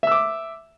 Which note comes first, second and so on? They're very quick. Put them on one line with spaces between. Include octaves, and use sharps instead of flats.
E5 E6 D6